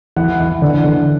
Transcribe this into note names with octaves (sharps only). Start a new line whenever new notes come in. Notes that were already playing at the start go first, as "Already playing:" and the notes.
E3 F#5
E3
D3
D3